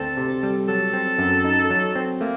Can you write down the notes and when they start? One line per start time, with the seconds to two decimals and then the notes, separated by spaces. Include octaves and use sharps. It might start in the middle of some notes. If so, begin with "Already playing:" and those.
Already playing: D2 C4 A4
0.17 C3
0.43 G3
0.68 F#3 A4
0.93 C4
1.19 F#2
1.45 D#4
1.70 F#3
1.96 C4
2.21 A3 A#3